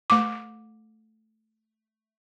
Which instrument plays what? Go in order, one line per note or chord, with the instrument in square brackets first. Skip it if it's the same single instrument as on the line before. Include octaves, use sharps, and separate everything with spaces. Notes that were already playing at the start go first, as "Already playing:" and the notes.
[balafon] A3 D6